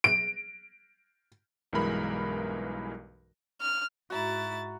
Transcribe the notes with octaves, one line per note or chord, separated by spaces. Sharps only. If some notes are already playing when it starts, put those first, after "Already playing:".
D7
B1 G2 E3 G#3 A#4 B5
F6
G#2 E4 F#4 A#5 A6